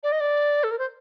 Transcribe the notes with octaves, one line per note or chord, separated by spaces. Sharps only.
D5
D#5
D5
A4
A#4
C5